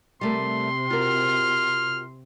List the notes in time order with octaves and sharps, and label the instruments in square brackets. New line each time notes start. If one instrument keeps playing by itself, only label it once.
[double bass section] C3 [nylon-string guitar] G3 A3 A#4 [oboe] C6
[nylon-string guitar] F4 F#4 A#4 [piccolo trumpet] F6